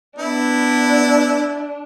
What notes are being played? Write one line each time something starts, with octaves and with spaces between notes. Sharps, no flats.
B3 D4 E4